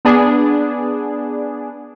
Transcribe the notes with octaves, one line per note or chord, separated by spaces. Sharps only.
B3 D4 G#4